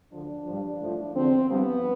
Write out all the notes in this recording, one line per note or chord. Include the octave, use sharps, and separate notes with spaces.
D2 D3 F3 D4
G2 F3
A2 F3
E2 D3 F3 C4
G2 F3 B3